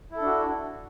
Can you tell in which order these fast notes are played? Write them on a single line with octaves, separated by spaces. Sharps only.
E4 A4 D4 F#4